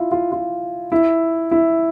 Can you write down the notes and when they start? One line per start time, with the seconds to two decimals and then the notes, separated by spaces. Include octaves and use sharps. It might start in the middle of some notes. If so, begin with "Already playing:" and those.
Already playing: E4 F4
0.12 F4
0.32 F4
0.92 E4
1.51 E4